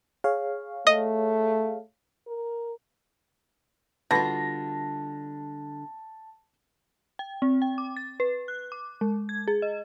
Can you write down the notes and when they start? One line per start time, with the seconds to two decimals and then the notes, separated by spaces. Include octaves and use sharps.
0.24 G#4 C#5 F5
0.87 A3 D#5
2.27 A#4
4.11 B2 D3 G3 F4 A5 A#6
7.19 G5
7.42 C4
7.62 G5
7.78 D6
7.96 A6
8.20 B4
8.48 F#6
8.72 D6
9.01 G#3
9.29 G#6
9.48 G#4
9.62 D#5